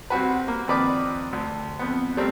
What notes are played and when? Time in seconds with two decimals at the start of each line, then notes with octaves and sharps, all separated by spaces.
0.10 C2 C4 F#4 B4
0.48 A#3
0.68 F2 D#3 B4 D5 D6
1.33 D2
1.79 F2 B3
2.17 G3 A3 C4 A#4